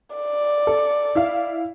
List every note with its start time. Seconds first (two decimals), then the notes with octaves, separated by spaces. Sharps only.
0.16 D5
0.67 A4
1.15 E4 E5 F5